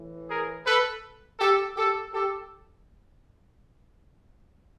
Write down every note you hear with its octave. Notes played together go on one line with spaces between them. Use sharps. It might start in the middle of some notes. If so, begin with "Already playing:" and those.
Already playing: A2 E3
G#4 A#4
A4 B4
G4 A4
G4 A4
G4 A4